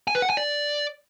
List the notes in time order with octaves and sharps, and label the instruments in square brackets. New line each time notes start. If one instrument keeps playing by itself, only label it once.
[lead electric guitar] G#5
B4
F#5
G#5
D5